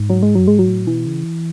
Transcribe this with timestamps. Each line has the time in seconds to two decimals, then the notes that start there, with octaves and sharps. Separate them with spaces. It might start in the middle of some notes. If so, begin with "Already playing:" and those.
Already playing: G#2
0.10 F#3
0.23 G#3
0.35 F#2 F#3
0.48 G#2 G#3
0.59 F#3
0.68 A2
0.87 B2 E3
1.06 C#3